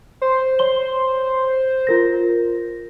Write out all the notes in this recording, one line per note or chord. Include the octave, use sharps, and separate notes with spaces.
C5
C#5 C6 G7
F4 A#4 A#6